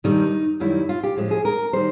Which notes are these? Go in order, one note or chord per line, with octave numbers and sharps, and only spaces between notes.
G2 D#3 G3 D#4
F#2 D#3 G3 E4
F4
G4
A2 F3 G#3
G#4
A#4
D#3 G3 C5